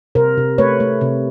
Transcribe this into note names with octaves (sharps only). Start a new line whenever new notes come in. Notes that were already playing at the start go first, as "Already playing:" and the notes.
C3 A#4 C5
C3
A3 B4 C#5
A3
C3